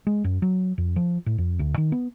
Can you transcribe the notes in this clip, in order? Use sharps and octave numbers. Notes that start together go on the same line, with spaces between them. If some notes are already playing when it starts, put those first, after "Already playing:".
G#3
F#2
F#3
F2
F3
A2
F2
D2
D#3
B3